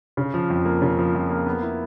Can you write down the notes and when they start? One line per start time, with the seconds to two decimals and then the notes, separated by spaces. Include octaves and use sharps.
0.17 C#3
0.34 F3
0.50 F2
0.65 A#3
0.82 C#3
0.99 F3
1.15 F2
1.30 A#3
1.46 B3
1.62 E4